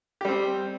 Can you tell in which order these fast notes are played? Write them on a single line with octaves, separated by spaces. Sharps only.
G4 G3 C4